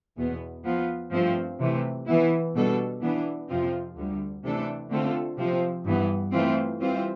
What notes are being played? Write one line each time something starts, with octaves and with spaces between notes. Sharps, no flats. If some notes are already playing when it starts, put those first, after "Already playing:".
E2 B2 B3
F3 B3 F4
G2 F3 A3 C4
C3 E3 A3
E3 B3 E4
B2 G3 D4 A4
E3 B3 D4
F2 C3 F3 C4 F4
D2 D3 G3
C3 E3 A3 D4 A4
D3 A3 C4 F4 A4
C3 F3 C4
G2 E3 B3
E3 A3 C4 F4
E3 G3 C4 F4